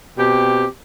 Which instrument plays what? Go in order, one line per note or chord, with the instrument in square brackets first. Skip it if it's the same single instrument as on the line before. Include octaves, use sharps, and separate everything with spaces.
[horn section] B2 C4 G4